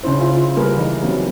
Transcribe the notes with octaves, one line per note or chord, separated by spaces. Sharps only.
C#3 C#4 D4 E4 C5
E4 F4
G3 A#3 G#4 A#4 B4
E3 D#4
F#3 A#3 C4 C#4